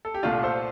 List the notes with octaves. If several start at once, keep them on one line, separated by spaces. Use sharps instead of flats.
A4
G4
C2 A#2 A3 D4 F4
A4 C5